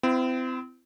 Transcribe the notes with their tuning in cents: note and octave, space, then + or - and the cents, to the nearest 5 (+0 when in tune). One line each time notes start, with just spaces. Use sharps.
C4 -30 E4 +35